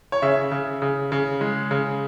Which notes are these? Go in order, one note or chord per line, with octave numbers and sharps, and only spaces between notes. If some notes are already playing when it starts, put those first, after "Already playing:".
C#5
C#3 E5
C#3
C#3
C#3
G#3
C#3